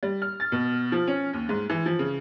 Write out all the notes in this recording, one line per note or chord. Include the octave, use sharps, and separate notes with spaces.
G3
F6
A6
B2
F3
C#4
D#2
G#2
E3
F3
C#3